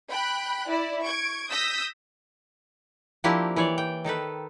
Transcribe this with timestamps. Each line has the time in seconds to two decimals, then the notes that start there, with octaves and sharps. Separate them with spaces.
0.10 G5 B5 F#6
0.67 E4 D5
1.03 C#6 G#6 D7
1.50 D#6 E6 G6 A#6 B6
3.24 F3 A#3 C4 D4 E4 G4
3.56 E3 C#5 D5
3.78 G5
4.04 D#3 D#4 A4 B4